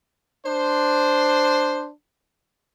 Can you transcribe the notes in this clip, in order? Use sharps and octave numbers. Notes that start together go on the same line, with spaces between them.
D4 C5